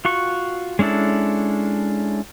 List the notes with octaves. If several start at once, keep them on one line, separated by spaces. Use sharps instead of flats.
F4 F#4 C#6
G#3 C#4 D4 E4 A4